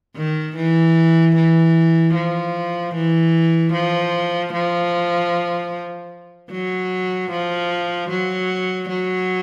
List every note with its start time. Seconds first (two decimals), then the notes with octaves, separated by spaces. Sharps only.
0.17 D#3
0.56 E3
1.36 E3
2.15 F3
2.95 E3
3.73 F3
4.53 F3
6.51 F#3
7.31 F3
8.10 F#3
8.89 F#3